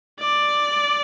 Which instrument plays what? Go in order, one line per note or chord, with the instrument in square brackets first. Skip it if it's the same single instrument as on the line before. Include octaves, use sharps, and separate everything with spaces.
[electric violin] D5